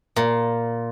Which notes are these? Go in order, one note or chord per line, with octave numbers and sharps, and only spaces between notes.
A#2